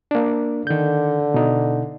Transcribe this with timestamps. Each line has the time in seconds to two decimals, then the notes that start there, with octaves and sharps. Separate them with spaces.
0.11 A#3 D4
0.67 D3 D#3 G6
1.34 B2 D#4